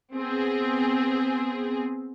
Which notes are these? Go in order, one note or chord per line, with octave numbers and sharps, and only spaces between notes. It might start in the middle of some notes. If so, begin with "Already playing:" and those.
B3 C4 G#4